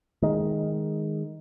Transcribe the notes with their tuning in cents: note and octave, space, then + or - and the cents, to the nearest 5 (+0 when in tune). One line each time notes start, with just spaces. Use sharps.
D#3 +5 G#3 +0